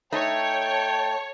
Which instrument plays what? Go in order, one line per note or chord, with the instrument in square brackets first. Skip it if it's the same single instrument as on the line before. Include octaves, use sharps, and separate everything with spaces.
[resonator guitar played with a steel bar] A3 D#4 [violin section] C#5 [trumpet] G5 [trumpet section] A5